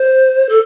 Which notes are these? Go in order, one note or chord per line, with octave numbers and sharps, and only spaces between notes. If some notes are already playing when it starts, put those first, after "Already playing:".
Already playing: C5
A4